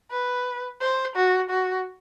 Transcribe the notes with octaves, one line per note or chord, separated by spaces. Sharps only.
B4
C5
F#4
F#4